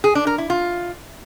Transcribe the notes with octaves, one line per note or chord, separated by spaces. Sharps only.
G#4
D4
A#4
E4
F4